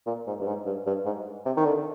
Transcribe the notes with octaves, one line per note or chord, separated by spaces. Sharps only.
A#2
G#2
G2
G#2
G2
G2
G#2
C3
D#3
D3